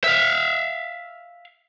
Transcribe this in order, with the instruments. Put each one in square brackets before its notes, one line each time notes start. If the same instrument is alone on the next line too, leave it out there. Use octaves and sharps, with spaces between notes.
[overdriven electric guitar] E5 F5